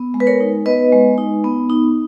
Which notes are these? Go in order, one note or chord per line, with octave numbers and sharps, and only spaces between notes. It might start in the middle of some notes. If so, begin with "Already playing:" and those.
Already playing: B3
G#3
B4
A#4 C#5
D#4
B3 B4 D#5
G#3
D#4
B3
D#4